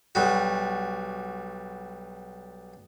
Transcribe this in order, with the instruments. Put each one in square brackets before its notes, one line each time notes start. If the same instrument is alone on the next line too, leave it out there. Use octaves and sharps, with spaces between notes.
[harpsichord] B1 G3 F#4